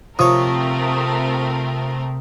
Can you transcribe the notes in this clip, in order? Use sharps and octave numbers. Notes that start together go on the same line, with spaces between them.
C3 F3 A3 C4 A#4 C#5 D#6